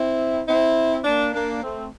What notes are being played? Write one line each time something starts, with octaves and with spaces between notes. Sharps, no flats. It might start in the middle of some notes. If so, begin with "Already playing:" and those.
Already playing: C4 E4
C4 E4
A#3 D4
A#3 D4
A3 C4